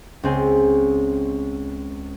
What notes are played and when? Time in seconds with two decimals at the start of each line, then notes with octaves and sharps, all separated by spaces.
0.23 C#2 C4 G#5